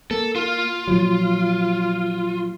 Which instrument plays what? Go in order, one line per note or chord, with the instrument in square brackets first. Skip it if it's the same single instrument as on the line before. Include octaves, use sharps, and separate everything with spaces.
[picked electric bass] A#3 [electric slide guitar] A4
[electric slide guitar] F4
[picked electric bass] A#2 F3 F#3